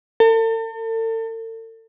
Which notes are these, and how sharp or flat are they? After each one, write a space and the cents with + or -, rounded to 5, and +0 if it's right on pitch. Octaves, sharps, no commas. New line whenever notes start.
A4 +40